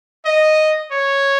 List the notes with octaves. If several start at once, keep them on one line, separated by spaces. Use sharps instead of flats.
D#5
C#5